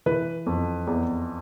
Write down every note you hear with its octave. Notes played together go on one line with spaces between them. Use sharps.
E3 B4
F2
E2